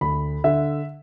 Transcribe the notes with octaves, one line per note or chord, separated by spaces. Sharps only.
D2 B5
D3 E5